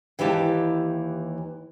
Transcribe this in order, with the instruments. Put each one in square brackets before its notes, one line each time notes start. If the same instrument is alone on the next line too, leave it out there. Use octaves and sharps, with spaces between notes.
[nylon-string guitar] D#2 E3 E4 G4 G#5 A5